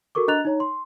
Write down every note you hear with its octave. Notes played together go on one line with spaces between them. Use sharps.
F#4 A4 A#4 C#6 D6
D4 D#5 A#5 F#6 A6 F7
D#4 C#5 A#5
C6